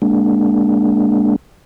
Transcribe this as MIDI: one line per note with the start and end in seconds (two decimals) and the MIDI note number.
0.02 1.36 56
0.02 1.36 58
0.02 1.36 62